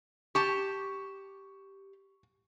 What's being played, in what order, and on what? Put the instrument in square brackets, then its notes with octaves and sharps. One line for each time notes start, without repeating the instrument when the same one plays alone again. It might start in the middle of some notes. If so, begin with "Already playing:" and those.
[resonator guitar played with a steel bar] G4 A5 [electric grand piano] C#6